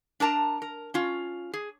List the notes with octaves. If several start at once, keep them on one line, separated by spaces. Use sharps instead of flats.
D4 A#4 A5 A#5
A#4
C#4 F4
G#4